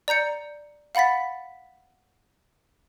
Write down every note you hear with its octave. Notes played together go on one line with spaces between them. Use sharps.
D5 A#5 G6 C#7
F5 F#5 B5 A6 B6